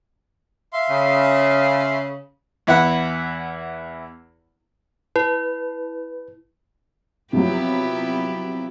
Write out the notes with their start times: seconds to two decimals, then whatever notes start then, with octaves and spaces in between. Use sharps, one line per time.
0.73 E5 F5 C6
0.90 C#3
2.67 E2 E4 B4 F#5 B5
5.16 E4 B4
7.33 C3 F3 F#3 B3 E4 G4